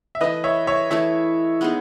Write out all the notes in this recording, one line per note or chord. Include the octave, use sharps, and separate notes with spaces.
E5
E3 A3 E4 B4 D#5
C#5 E5
C#5 E5
E3 A3 E4 C#5 E5
G#3 B3 D#4 G#4